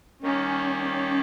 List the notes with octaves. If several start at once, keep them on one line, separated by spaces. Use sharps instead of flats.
D#3 G3 A#3 C#4
C#4